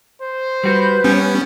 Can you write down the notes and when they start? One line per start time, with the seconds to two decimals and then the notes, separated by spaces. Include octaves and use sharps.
0.22 C5
0.63 G3 F#4 B4 G6
1.04 G3 B3 C#4